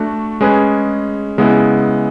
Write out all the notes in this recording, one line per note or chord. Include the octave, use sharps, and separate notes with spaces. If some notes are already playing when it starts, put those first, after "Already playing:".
Already playing: A3 D4 F#4
G#3 C#4 G#4 B4
C#3 G#3 B3 E4